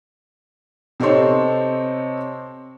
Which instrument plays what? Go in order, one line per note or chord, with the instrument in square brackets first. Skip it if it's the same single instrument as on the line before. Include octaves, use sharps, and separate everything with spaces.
[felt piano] C3 C4 D#4 A4 C#5 C6